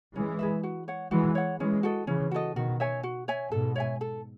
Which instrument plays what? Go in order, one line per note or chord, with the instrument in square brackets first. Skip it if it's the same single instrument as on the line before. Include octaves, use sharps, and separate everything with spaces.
[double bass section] E3 G#3 [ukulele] C#4
[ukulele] G#4 B4 E5
F#4
C#5 F#5
[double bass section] E3 G#3 [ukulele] F#4
[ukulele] C#5 F#5
[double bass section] E3 G#3 [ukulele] C#4
[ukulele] F#4 A4 D#5
[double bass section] C#3 E3 [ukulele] C#4
[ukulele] F#4 A4 D#5
[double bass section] B2 D#3 [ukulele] F#4
[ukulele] C#5 E5 G#5
F#4
C#5 E5 G#5
[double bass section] G#2 B2 [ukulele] A4
[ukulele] C#5 E5 G#5
A4